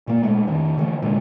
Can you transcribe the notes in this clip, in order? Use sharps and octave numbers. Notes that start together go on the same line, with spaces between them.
A#2 A#3
A#2 G#3 A3
F2 D#3
D3 E3 A3
C2 A#2 D3 G#3